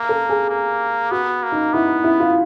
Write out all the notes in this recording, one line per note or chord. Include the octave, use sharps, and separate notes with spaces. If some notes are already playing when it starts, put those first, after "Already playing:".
Already playing: A#3
A4
G#4
A#3
B3 F#4
A#3
D#4
B3 E4
E4
E4
F4